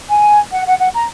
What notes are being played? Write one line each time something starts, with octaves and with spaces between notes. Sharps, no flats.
G#5
F#5
F#5
F#5
A#5